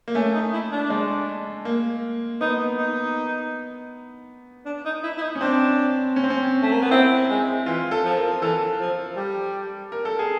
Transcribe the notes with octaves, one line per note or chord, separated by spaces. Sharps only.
A#3
A3 C#4
D#4
E4
D4
G#3
A#3
B3 D#4
D#4
D4
D#4
E4
E4
D#4
C#4
C4 D4
C#4
C4
C#4
A3
A#3
B3
C4 E4
G#3
E3 F4
A4
F3
A#4
E3 A4
F3
G3
A#4
A4
G#4